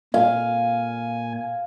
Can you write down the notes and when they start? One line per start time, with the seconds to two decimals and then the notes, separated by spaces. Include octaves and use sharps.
0.14 A#2 F5 G#5